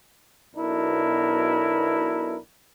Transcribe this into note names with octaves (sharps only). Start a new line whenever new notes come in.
B1 B2 D4 E4 A#4